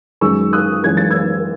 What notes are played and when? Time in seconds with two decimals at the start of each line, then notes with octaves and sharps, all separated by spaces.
0.21 F#2 D#3 G#3 C#6 E6
0.53 D#6 F#6
0.84 F#2 E3 G#3 G#6
0.97 A6
1.10 E6 G#6